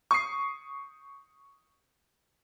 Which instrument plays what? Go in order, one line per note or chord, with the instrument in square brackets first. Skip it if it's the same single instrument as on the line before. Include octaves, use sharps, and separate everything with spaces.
[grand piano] C#6 D#6 C7